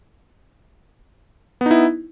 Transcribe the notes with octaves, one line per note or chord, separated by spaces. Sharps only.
B3 D#4 E4